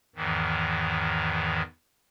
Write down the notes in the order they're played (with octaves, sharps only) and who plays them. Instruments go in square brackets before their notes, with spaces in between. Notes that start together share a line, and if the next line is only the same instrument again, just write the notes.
[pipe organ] E2 G#2 D#3 E3